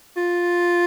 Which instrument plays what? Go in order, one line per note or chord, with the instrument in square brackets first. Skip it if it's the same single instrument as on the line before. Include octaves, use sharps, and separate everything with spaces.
[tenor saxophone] F4